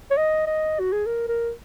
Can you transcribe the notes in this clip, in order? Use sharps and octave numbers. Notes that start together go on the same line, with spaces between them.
C#5
D#5
D#5
F#4
G#4
A#4
A#4